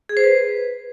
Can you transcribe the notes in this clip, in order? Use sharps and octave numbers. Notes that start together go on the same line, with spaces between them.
G#4
C5
B4